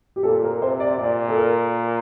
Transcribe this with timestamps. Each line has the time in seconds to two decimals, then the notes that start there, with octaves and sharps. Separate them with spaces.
0.16 G4
0.23 A#2 A4
0.43 A#4
0.61 C3 C5
0.80 D5
0.98 A#2 D5
1.28 A4
1.37 A#4